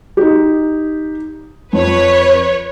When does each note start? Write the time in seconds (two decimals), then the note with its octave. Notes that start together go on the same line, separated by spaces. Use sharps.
0.17 D#4 G4
1.73 F2 B4 C#5